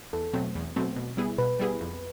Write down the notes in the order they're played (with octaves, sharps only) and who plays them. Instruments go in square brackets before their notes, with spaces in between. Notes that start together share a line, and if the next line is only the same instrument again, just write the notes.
[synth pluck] E2 [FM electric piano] A4
[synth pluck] B2 F#3 A3 C4
E2
B2 F#3 A3 C4
B2
G3 B3 E4 G#4
[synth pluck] B2 [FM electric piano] B4
[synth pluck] G3 B3 E4 G#4
F2